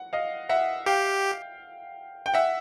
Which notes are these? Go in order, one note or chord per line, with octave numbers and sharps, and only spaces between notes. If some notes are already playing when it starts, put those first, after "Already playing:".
Already playing: F#5
D#5 F5
E5 F#5
G4 F5 G5
G5
E5 F#5